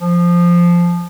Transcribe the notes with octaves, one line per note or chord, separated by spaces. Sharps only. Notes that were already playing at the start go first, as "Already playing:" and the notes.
F3